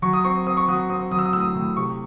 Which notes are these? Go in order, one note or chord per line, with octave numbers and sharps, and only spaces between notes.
F#3 C#6
D#6
C4 C#6
C4 D#6
C#6
F#3 D#6
C4 D#6
F#3 D#6
E6
D#6
A2 E6
D#6
A2
C3 C#6